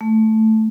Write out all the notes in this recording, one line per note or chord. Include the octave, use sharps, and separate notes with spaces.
A3